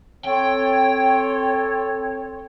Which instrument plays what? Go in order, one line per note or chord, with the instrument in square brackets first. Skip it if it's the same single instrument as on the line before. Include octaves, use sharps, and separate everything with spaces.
[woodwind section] C4 A4 C#5 [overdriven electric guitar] G5